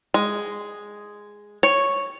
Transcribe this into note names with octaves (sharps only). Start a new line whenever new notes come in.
G#3
C#5